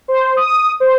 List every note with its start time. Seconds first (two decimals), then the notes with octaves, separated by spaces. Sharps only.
0.08 C5
0.37 D#6
0.80 C5